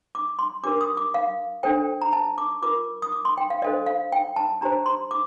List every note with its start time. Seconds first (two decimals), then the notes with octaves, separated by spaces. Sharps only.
0.15 D6
0.39 C6
0.63 D4 G4 A#4 D6
0.81 D#6
0.97 D6
1.14 F5
1.63 D4 A4 C5 G5
2.02 A#5
2.13 A5
2.38 D6
2.62 F4 A#4 D6
3.02 D#6
3.12 D6
3.25 C6
3.38 G5
3.50 F5
3.62 D4 A4 C5 D#5
3.86 F5
4.12 G5
4.36 A5
4.61 D4 G4 C5 A#5
4.86 C6
5.11 D6